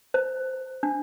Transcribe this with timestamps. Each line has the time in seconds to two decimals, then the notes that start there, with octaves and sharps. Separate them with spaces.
0.14 C5
0.83 D4